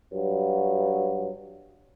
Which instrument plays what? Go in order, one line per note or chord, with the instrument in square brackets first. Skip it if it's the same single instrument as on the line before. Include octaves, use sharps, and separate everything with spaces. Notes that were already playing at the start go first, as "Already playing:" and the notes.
[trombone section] G2 F#3